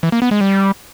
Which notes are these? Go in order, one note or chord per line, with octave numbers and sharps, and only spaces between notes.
E3
A#3
B3
G#3
G3